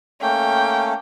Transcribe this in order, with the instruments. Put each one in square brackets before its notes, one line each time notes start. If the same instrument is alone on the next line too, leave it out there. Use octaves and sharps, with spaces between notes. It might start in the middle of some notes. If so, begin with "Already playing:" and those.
[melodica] A3 A#3 C#4 [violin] G5